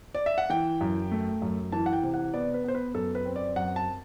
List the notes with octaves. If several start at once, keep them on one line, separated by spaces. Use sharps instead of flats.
D5
E5
F#5
E3 G5
F#2
A3
F#2
E3 A5
F#5
G5
C3
F#5
B3 D5
B4
B3 C5
B4
F#2 A4
B4
C4
D5
F#2 F#5
A5